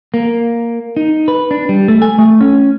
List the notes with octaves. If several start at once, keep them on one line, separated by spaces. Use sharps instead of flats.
A#3
D#4
B4
D4
G3
A3
G#5
A3
C#4